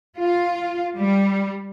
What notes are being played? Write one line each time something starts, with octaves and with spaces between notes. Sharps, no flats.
F4
G3